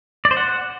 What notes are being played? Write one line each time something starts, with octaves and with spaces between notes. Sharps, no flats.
D5
C5
F#5